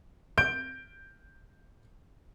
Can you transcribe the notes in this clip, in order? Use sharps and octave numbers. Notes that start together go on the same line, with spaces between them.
G6 D7